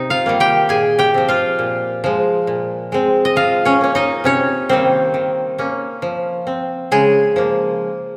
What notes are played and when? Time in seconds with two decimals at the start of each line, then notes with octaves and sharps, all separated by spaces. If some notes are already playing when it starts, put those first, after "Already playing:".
Already playing: C3 D#4
0.10 F4 F5
0.26 D#3 G3 A#3
0.40 G4 G5
0.69 A#2 G#4 G#5
0.99 G4 G5
1.14 F3 C4
1.28 F4 F5
1.59 A#2
2.04 F3 G#3
2.47 A#2
2.92 G#3 C4
3.25 D#5
3.36 F3 F4 F5
3.65 C#4 C#5
3.81 A#3 C#4
3.95 D#4 D#5
4.24 C3 C#4 C#5
4.69 D#3 G3 A#3 C4 C5
5.14 D#3
5.58 A#3 C#4
6.02 F3
6.47 C4
6.91 C#3 G#3 G#4
7.36 F3 A#3